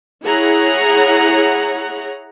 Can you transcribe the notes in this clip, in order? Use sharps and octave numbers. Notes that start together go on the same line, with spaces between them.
E4 G#4 C#5 F#5 A#5